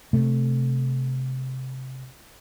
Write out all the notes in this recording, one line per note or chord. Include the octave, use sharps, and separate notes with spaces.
C3 A3